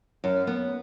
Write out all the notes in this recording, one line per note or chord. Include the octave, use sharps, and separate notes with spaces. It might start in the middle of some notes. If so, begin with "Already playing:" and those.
F#2
B3